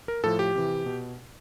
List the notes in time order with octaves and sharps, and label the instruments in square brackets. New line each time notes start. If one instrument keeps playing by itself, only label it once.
[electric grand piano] A#4
A2 F3 A4
G4
C3 E3
B2